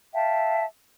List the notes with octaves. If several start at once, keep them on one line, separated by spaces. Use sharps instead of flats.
E5 F5 G5 A5